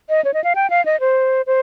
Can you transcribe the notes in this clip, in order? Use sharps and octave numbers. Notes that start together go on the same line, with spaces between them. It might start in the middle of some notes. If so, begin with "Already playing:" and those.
D#5
C#5
D#5
F5
G5
F5
D#5
C5
C5